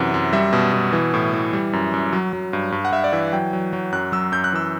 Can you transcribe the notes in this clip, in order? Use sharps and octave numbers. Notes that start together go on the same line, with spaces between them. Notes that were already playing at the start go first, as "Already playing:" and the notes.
Already playing: F#2 C3 E3 F#5
F#2
G3 E5
B2
B2
E3
A2
E3
G3
F#2
F#2
F#3
F#3
G2
G2
F#5
G2 E5
D5
E3 E5
F#3 G5
F#3
F#3
F#2 F#6
F#3 E6
F#2 G6
F#6
E3 E6